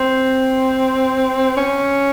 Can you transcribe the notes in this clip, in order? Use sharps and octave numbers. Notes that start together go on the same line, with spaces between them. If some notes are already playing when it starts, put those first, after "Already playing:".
Already playing: C4
C#4